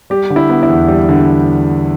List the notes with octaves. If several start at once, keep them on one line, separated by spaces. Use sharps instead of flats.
G3 G4
D3
E4
B3
E4
E2
G3
D3